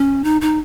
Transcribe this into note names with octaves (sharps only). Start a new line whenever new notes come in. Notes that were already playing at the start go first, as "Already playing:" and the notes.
Already playing: C#4
D#4
D#4